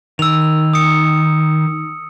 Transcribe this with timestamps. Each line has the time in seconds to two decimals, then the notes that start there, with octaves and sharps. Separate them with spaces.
0.19 D#3 E6 F7
0.74 D#6 C#7